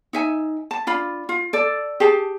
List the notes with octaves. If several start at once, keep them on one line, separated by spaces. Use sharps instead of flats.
D#4 E5 G#5
A5
D4 F4 B5
F4
A4 D5
G4 G#4 A5